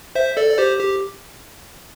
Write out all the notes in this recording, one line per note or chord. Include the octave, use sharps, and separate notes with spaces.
C5 E5
A4 D5
D5
G4 C5
G4